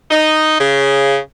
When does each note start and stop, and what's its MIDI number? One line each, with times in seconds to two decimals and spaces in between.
0.11 0.56 63
0.59 1.17 49